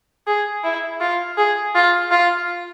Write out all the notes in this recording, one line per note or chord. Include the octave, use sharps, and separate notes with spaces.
G#4
E4
F4
G#4
F4
F4